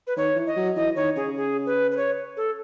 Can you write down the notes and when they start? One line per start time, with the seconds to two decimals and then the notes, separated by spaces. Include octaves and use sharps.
0.07 B4
0.17 D#3 C#5
0.36 E3
0.47 D#5
0.56 F#3
0.76 E3 D#5
0.96 D#3 C#5
1.16 C#3 G#4
1.36 G#4
1.66 B4
1.91 B4
1.97 C#5
2.37 A4